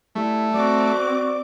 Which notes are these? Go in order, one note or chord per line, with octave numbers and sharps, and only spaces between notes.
G3 A3 E4
C4 F#4 D5 D6